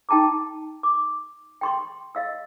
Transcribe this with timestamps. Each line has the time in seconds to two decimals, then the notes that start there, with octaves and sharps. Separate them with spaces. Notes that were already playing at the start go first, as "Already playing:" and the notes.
0.09 D#4 G5 A5 A#5 D6
0.83 D6
1.61 G5 C6 C#6
2.15 D#5 F5 E6